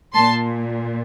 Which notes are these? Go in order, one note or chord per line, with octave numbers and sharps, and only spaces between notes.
A#2 A5 C6